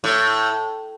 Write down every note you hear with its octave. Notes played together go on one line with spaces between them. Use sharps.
A2